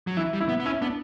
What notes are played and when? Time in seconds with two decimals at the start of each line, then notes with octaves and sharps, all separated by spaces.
0.07 F#3
0.17 E3 E4
0.33 G3
0.41 E4
0.49 B3
0.60 B3
0.65 C#4 E4
0.82 B3 D4